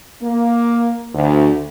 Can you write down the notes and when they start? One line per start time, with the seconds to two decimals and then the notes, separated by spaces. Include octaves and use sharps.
0.23 A#3
1.15 D2